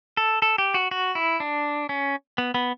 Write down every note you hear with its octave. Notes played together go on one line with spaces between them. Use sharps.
A4
A4
G4
F#4
F#4
E4
D4
C#4
B3
B3